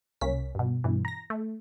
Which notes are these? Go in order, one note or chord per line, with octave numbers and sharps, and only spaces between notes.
C2 A#3 C#4 B6
G2 B2
G2 B2 E3
A#5 A#6
A3